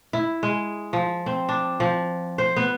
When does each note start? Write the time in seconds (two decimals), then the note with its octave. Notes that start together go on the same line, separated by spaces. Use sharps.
0.13 E4
0.43 G#3
0.93 F3
1.26 C4
1.49 D4
1.80 F3
2.38 C5
2.56 B3